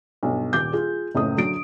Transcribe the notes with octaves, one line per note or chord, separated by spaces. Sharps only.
B1 G2
D#1 D6 G6
F4 G#4
F#1 C#2 A2 D#6
D3 F#3 D7